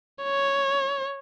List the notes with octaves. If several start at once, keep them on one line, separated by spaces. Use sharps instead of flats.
C#5